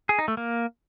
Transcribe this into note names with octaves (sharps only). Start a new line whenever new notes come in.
G#4
D#4
A3
A#3